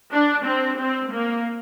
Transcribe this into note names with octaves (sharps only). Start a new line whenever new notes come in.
D4
C4
C4
A#3